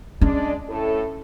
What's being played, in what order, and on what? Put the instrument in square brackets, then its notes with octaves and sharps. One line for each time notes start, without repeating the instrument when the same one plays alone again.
[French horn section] G#3 D4 D5 [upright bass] C#4
[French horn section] A2 A4